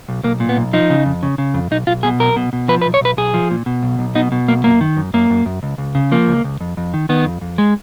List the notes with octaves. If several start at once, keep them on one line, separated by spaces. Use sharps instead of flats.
B1
B1 A#3
A#2
B3
B1
F3 D#4
C#3
F2
C#3
C#3
F2
B1 D#4
B1 F4
B2 G#4
B1 A#4
B2
B2
F3 B4
B4
B1
C#5
B1 B4
B1 G#4
F3
A#2
B2
B1
B1
B2 D#4
B2
B1 A#3
F#2 A#3
D#3
F#2
F#2 A#3
F#2
F#2
C#2
C#2
C#3
F3 A#3
C#2
C#2
F2
F2
D#3
D#3 B3
F2
F2
G#3